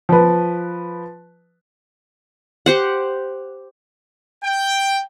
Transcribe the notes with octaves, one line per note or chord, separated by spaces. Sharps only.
F3 B4
G4 C5 F#5
G5